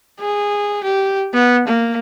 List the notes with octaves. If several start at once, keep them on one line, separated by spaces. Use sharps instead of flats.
G#4
G4
B3
A#3